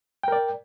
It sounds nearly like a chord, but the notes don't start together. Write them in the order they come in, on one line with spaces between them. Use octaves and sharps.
G5 A#4 D5